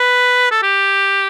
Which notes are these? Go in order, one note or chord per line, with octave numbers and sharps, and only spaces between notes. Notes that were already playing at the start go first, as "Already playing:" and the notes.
Already playing: B4
A4
G4